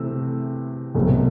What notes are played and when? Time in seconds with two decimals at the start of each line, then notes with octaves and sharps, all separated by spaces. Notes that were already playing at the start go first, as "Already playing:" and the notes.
Already playing: C3 E3 A3 C4 E6
0.95 C2 B2 F#3 A3 C4